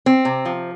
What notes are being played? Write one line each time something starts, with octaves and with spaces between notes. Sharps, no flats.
C4
C3
F3